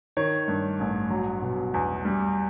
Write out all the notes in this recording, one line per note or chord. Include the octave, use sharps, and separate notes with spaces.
D#3 C#5
G2
A1
F#3
B2
E2
G3